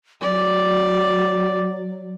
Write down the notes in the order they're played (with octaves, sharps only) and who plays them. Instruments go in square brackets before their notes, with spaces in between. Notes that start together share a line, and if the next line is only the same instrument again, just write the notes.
[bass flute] F#3 [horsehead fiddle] D5